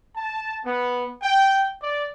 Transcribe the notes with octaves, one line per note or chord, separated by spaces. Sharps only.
A5
B3
G5
D5